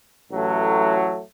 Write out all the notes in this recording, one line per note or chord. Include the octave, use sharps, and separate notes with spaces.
A1 A2 F#3 A3